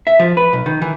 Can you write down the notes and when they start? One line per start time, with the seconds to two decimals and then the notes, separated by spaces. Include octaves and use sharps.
0.07 E5
0.20 F3
0.37 B4
0.53 B1
0.66 D#3
0.82 E3